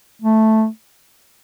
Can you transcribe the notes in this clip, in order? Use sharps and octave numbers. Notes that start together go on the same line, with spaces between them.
A3